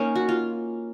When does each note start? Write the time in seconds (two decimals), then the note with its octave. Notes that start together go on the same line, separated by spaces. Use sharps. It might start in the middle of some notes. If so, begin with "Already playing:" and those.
Already playing: A#3 C#4 D#4
0.16 F#4
0.29 F4